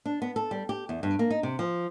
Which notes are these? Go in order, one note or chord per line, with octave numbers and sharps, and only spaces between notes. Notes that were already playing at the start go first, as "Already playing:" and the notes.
D4
B3
A4
G3
G4
E2
G2
A#3
D#4
C3
F3